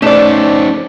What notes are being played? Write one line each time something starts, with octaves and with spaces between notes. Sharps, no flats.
A3 C#4 D#4 C5 D5